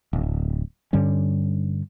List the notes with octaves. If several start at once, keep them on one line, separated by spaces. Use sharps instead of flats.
D1
G2 D3 G3 C#4